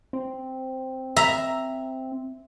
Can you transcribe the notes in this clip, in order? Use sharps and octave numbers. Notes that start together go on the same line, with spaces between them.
C4
E5 A#5